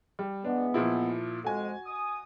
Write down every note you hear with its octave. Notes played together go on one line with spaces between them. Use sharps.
G3
E3 G#3 B3 D4
A#2 F3 E4
F2 G#3 F#4 G#5
D#6